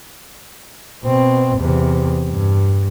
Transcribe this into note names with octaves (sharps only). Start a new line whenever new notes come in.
B2 C4
E2 C3
G2